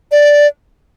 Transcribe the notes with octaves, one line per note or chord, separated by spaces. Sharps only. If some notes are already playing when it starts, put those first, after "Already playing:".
D5